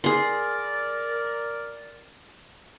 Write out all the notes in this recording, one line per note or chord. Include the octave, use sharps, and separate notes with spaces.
G#4 A#4 D5 C6